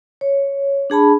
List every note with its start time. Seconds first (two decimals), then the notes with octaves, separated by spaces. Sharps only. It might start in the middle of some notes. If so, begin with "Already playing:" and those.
0.21 C#5
0.90 D4 G#4 A5 B5